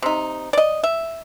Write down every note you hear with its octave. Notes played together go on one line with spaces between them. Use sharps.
C3 D#4
D5 D#5
E5